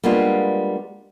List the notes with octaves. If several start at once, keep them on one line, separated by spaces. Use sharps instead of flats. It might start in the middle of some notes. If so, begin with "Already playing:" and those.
G3 G#3 A#3 B3 D4 F4